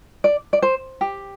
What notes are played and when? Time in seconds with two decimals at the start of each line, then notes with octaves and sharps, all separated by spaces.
0.24 D5
0.53 D5
0.62 C5
1.01 G4